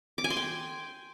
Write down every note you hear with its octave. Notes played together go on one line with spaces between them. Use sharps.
D6
G#5
C6
G5